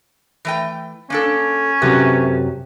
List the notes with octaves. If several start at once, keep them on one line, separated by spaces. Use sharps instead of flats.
E3 A3 G5
A#3 C#4 D4 A4
F#2 C3 A3 F#4 G4 B4